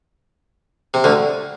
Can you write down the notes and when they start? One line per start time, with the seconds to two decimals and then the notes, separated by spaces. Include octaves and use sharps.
0.94 C3
1.04 D2 D3